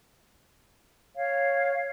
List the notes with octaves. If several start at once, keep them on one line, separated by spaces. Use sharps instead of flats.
C#5 F5